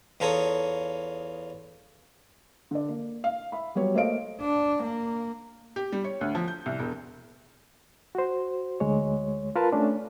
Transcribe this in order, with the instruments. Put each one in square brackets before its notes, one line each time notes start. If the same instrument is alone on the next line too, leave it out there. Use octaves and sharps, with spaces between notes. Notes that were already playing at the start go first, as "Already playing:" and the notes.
[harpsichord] E2 F4 A4 C#5 A#5 D#6
[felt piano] D3 D5
A#3
F5
E5 B5
F#3 G3 B3 C#5
A3 A#3 C5 D#5 F5 D7
[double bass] D4
A#3
[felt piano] G4
G3
C#5
D2
F3
G6
C2
E1
[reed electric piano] F#4 C5
D2 G#3 C#5
F4 A#4 B4 A5
A3 C#4 D4